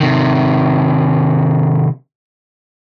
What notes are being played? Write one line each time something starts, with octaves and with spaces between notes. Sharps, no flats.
C3 D#3